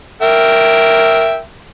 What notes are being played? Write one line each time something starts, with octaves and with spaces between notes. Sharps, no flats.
A#4 E5 G5